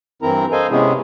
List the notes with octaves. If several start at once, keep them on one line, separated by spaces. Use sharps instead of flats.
G2 E3 C4 E4 A#4 A#5
A4 C5 D#5 F5 G#5
C3 G#3 B3 C#4 E4 G#4